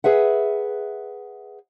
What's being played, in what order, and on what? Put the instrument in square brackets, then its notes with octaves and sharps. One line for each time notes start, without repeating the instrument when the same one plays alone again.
[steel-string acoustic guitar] G#4 B4 E5 F#5